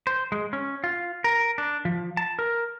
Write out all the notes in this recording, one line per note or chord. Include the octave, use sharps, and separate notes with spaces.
C5
G#3
C#4
F4
A#4
D4
F3
A5
A#4